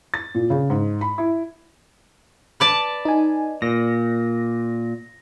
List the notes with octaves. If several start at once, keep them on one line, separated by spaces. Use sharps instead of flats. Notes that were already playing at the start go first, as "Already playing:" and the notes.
A6
A#2
C#3
G#2
B5
E4
B4 D5 A5
D#4 G#5
A#2 A#6